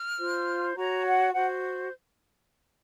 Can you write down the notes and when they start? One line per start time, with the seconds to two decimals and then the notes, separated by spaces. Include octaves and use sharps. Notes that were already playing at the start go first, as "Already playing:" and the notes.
Already playing: F6
0.19 F4 C5
0.77 F#4 C#5 A#5
1.06 F#5
1.34 F#4 C5 F#5